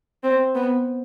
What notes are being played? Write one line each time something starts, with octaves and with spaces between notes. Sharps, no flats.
C4
B3